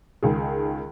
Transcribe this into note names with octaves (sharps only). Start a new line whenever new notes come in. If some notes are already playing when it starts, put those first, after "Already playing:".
C#2 D#3 G#4